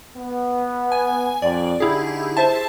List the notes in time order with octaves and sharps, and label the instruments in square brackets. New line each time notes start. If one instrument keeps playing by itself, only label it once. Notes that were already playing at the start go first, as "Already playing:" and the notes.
[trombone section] B3
[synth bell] G#5
[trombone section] F2 [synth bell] D5
[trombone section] D3 D#4 [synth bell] E4 G4 G#4
[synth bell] C5 E5 A5